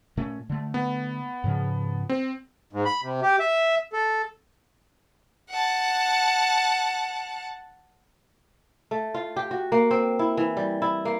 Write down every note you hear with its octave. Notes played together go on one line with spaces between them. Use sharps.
A#2 A3 C#4
D3 A3
B3
G#2 C#3 F3
C4
G#2
B5
C3
G4
E5
A4
F#5 A5
A3
F4
G4
F#4
A#3
C4
E4
E3
G3
E4
A#3